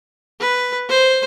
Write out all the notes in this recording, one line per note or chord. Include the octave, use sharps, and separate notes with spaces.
B4
C5